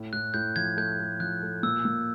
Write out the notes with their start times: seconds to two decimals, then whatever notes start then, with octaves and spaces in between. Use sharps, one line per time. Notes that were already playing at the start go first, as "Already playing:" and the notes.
Already playing: A2
0.13 A2 F#6
0.34 A2 G6
0.56 F3 G#6
0.77 A3 G6
1.00 A3
1.20 F3 F#6
1.43 A3
1.63 A#2 E6
1.85 A#2